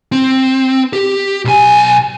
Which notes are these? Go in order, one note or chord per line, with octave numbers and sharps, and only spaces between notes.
C4
G4
B1 G#5